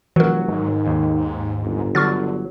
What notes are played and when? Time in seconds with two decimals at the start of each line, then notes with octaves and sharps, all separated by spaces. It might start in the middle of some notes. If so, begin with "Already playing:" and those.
0.16 F1 E3 F#3 F#4 A#4
0.48 G#2 D#3
0.87 D#2
1.63 G1
1.95 D3 F#3 C#6 F6 A6